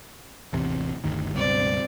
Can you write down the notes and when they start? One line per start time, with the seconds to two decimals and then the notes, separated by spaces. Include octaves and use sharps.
0.53 A1 E2 C3
1.04 G1 D2 D#3
1.35 C#2 G2 B2 C4 D5